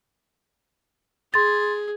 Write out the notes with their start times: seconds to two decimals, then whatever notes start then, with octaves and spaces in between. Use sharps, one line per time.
1.34 G#4 C6 A6